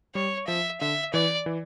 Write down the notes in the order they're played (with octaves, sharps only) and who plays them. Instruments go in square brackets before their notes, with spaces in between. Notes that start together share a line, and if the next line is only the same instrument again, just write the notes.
[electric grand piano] G3 [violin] C#5
[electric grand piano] F3 [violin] E5
[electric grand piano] D3 [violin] E5
[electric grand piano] E3 [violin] D5
[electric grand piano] E3